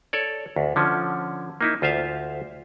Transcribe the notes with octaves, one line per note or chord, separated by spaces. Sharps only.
A4 C#5 D5
D2
D3 F3 C#4
A#3 D#4 E4
D2 F4 C5 E5 F5